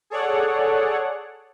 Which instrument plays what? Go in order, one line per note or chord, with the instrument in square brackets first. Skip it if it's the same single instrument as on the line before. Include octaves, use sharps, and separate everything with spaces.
[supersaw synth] G#4 A4 C#5 D5 F#5